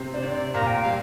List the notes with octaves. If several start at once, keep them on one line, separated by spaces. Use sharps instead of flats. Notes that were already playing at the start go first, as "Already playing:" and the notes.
Already playing: C3 C4
D4 C5
C3 C4 D5
A#2 A#3 A#5
G5
G3 F5